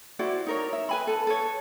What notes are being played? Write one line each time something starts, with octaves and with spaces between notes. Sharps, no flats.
E4 F#4 C5 D5
D#4 A#4 C#5
E5
B4 G#5 B5
A4
A4 B4 C#5